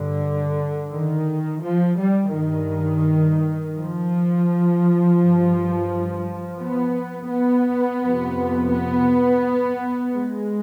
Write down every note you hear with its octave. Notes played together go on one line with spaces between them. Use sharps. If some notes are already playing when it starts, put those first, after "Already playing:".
Already playing: G2 D3
D#3
F3
G3
G2 D#3
F3
G2
B3
B3
F2 C3
B3
G#3